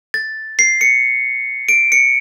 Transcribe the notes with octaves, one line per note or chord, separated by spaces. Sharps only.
A6
C7
C#7
D7
C#7